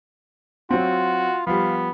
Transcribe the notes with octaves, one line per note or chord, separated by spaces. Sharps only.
F#3 C4 F4 F#4
F3 G3 B3 F5